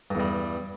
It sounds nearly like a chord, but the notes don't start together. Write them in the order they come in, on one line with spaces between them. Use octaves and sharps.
G2 E2 G3